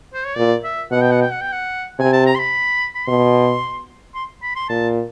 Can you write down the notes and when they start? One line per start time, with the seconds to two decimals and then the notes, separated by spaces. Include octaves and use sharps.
0.14 C5
0.24 C#5
0.36 A#2 D5
0.64 E5
0.91 B2 F#5
1.01 G5
1.12 F#5
1.21 G5
1.32 F#5
1.41 G5
1.52 F#5
1.99 C3 G#5
2.13 A5
2.26 A#5
2.35 C6
2.39 B5
2.95 B5
3.07 B2 C6
4.14 C6
4.42 B5
4.56 C6
4.69 A#2 A5